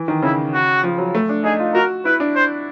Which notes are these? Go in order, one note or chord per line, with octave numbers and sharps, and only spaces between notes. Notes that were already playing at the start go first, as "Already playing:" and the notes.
Already playing: E3
D#3
C#3 E4
F#4
F3
F#3
A3
D4
D#4 G#4
F4
F#4 A#4
E4 B4
D4
C5